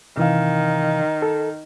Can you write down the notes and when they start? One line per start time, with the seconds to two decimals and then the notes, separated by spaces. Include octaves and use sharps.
0.17 C3 D#3 E3 F5
1.22 A4